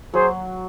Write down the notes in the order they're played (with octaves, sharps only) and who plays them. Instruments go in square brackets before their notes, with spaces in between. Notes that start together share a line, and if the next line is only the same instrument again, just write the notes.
[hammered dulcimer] F#3 [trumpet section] G#4 C5